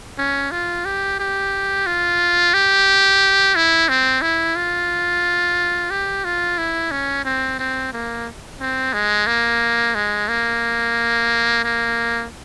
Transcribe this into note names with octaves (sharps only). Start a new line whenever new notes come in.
C#4
F4
G4
G4
F4
G4
E4
C4
E4
F4
G4
F4
E4
C#4
C4
C4
A#3
C4
G#3
A#3
G#3
A#3
A#3